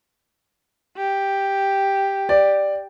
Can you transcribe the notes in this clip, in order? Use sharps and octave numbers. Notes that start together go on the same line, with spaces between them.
G4
D5